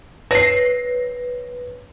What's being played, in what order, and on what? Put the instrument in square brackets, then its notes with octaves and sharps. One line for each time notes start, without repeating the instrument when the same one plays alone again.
[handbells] B4 C#5 [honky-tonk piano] A#6 C7